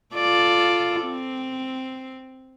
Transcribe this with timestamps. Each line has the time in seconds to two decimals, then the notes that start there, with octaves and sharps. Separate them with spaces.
0.14 F4 A4 D5
1.03 C4